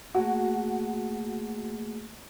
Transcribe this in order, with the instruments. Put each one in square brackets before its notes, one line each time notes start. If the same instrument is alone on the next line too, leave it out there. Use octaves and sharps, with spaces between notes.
[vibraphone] A3 A#3 G#4 [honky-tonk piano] F#4